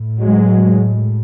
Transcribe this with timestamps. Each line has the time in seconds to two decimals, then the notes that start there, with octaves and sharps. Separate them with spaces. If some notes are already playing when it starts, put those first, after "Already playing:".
Already playing: A2
0.20 F#3 G#3